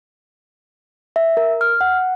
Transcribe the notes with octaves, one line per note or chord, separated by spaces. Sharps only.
E5
A#4
F6
F#5